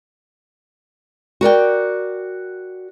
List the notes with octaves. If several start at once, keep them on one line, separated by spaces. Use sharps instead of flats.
F#4 A#4 D5 G5